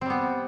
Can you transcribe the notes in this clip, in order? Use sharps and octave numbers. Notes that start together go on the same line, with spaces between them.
G3 B3 C4